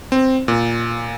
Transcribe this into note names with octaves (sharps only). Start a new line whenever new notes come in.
C4
A#2